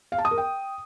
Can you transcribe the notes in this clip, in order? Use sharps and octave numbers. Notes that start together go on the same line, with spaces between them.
F5
A5
D#6
A#4
G5